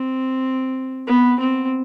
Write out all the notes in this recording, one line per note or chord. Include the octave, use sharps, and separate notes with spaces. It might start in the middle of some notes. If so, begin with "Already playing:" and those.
Already playing: C4
B3
C4